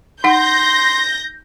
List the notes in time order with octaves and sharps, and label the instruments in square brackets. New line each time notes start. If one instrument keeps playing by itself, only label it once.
[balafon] D#4 F#5 [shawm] C6 [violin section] G6 A#6